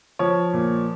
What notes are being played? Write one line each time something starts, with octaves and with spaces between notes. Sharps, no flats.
F3 C#5
A#2